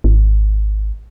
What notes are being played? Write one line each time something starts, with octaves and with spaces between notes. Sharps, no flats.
G#1